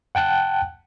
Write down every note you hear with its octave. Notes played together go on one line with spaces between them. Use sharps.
F#5 G5 A5 F#6